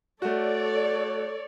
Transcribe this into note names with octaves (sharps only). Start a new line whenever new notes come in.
A3 F#4 A4 C#5 D5